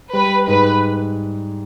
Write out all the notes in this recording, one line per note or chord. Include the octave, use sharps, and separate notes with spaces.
G3 B4
G#2 B4